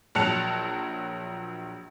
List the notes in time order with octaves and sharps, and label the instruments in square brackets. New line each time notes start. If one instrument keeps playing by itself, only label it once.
[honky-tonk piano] A#1 F#3 A5 F#6 C#7 F7